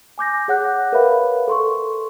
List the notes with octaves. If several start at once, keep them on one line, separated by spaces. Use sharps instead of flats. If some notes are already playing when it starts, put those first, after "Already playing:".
G#5 D6 G6 A#6
G#4 C#5 F#5 D6 F#6 G6
A#4 B4 C#5 E5 F5 B5
A4 C6 C#6